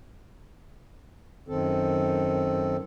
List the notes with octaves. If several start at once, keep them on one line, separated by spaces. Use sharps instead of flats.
F#2 D#3 C4 A4